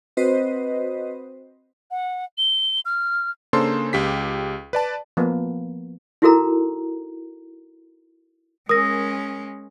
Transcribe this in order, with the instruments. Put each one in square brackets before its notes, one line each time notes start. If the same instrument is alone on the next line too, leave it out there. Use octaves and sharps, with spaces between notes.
[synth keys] C4 F#4 B4 C5 D#5
[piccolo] F#5
G7
F6
[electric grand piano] C#3 A#3 D4 A4 C5 C6
C#2 G4 B6
B4 D5 A5
[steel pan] F3 A#3 B3
[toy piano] D#4 E4 F#4 A4 A#4 A#5
[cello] G#3 C#4 [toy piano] A#4 [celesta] D#6 A#6